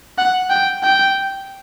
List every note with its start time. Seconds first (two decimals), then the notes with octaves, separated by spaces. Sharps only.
0.18 F#5
0.50 G5
0.83 G5